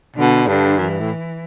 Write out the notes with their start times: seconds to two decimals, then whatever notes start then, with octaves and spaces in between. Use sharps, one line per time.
0.16 B2 D3
0.47 G2 D3
0.79 F#2 E3
0.90 G2
1.00 A2